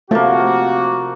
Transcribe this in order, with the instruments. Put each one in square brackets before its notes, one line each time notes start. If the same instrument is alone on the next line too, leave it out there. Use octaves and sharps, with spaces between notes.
[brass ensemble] C3 F#4 [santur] F3 A#3 [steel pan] A3